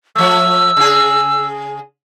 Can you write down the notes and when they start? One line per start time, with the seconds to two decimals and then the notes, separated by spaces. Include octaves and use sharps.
0.15 F3 A3 E6
0.77 C#3 G#4